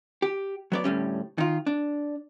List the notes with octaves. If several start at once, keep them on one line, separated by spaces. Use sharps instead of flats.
G4
F#3 B3 D5
D2 A2 G3 C#4
D#3 F4
D4